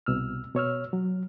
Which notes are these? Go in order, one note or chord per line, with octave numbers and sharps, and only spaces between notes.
C2 B2 E6 F6
B2 C#5 E6 F6
F#3